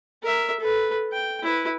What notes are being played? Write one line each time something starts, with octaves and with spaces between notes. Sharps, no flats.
A#4 E5
A4 B4
G5
E4 B4